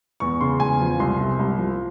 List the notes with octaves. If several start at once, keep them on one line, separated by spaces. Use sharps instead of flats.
E2 C#6
C#3 C6
E2 G#5
F3
C2 C6
C3
C2
F3